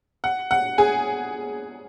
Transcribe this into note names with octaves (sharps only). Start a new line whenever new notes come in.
F#5
F#5
G#4 G#5